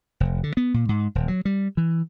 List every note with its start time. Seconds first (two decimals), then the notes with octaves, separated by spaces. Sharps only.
0.20 F1
0.43 D3
0.57 B3
0.74 A#2
0.89 G#2
1.15 D#1
1.28 F#3
1.45 G3
1.77 E3